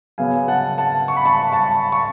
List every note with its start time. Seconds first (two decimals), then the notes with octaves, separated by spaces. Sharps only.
0.18 C#3 F#3 B3 F5 G#5
0.48 F#5 A5
0.78 F#5 A5
1.08 C#6
1.17 B5
1.25 A5 C#6
1.52 A5 C#6
1.92 C#6